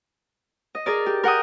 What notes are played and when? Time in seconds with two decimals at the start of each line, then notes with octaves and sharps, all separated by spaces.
0.75 D#5
0.86 G#4 A#4 D5
1.06 G4
1.23 A#4 F#5 G5 D#6